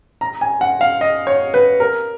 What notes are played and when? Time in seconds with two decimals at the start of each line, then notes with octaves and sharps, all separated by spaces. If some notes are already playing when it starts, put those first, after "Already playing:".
0.21 A#5
0.41 G#5
0.61 F#5
0.81 F5
1.01 D#5
1.27 C#5
1.54 B4
1.80 A#4